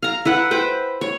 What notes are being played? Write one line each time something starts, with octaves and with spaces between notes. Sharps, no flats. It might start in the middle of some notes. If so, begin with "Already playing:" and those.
F5 A#5
E4 B4 F#5
B4 C5 G5
C#5